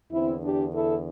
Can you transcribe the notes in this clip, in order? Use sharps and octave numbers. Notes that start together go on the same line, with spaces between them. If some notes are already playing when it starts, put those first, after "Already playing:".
E2 D3 C4 E4
D4 G4
E4 A4